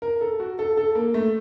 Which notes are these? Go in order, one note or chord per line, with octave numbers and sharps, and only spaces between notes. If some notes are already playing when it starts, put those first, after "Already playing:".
A#4
A4
F#4
A4
A4
A#3
A3